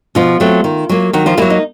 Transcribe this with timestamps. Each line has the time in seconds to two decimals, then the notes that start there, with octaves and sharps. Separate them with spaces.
0.15 B2 F3 F4
0.40 F#3 A3 C4
0.64 D#3
0.89 F#3 A#3
1.13 D#3 F#3 F#4
1.26 F3 F4
1.37 E3 F#3 A#3 E4
1.50 D#4